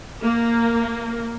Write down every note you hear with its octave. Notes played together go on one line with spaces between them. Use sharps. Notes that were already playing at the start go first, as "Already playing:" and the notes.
A#3